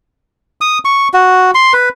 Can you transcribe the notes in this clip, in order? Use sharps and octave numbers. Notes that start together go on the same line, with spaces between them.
D#6
C#6
F#4
C6
B4